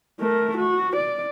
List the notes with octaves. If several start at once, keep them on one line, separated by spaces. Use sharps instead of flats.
A3 A#4
F#4
D5